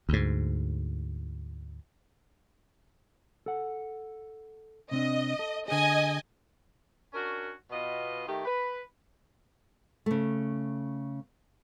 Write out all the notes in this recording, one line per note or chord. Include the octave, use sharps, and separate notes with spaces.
D2 G#2
A4 F#5
C3 C4 D4 D#5
A4
D3 G#4 D#5 G#5
C#4 D4 F#4 A#4
B2 B3 F4 D#5
D#3 A3 G4
B4
C#3 A3